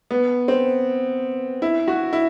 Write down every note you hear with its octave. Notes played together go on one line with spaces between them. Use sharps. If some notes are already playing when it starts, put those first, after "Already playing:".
B3
C4
E4
F#4
E4